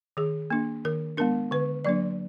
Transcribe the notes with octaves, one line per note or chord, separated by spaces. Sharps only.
D#3 G#4
A#3 D4
D#3 A#4
G#3 B3 D4 A#4
D3 B4
F#3 A#3 D4 D5